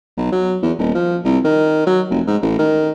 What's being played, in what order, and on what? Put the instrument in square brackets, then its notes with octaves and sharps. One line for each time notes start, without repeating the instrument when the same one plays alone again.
[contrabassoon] B1
F#3
E2
D#1
F3
C2
D#3
F#3
F1
G#2
A1
D#3